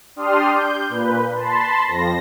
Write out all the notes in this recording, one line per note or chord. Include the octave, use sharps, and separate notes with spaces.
D4 G4 D5 C6 D#6 F6
G6
A#2 B4
A5 B5 C6
F2 F3 A#6